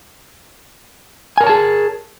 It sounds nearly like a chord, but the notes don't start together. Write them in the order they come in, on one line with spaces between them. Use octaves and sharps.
G#5 A#4 C#5 A5 G#4